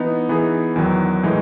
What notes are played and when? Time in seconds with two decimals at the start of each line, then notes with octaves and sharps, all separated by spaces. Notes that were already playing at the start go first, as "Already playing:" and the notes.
Already playing: E3 B3 D#4
0.29 E3 B3 D#4 G#4
0.76 E2 D#3 F#3
1.23 A2 E3 G#3 D#4 G#4